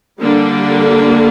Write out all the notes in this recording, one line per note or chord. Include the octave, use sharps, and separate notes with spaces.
D3 G3 A#3 D4